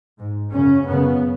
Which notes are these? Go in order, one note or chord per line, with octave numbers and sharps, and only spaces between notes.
G#2
F#2 C#3 C#4
F#2 C#3 B3